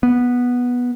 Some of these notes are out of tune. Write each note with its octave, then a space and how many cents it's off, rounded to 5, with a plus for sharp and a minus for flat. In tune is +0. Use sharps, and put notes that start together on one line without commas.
B3 -10